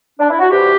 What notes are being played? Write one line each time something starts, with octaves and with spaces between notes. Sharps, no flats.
D4
E4
F#4
C2 C3 E3 G4